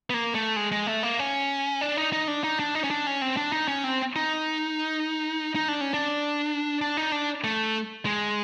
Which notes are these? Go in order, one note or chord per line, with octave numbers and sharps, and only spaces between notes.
B3
A#3
A3
G#3
G#3
A3
A#3
C#4
D4
D#4
D#4
D4
D#4
D4
D#4
C#4
D4
C#4
C4
D4
D#4
C#4
C4
D#4
D#4
D4
C#4
D4
D4
D#4
D4
A3
G#3